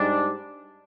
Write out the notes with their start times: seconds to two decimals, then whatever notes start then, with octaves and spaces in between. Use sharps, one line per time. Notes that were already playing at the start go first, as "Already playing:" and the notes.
Already playing: G#2 G3 D4